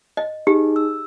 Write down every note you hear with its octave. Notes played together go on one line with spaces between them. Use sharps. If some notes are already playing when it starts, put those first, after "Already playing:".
D#5
D#4 G4 G#4
E6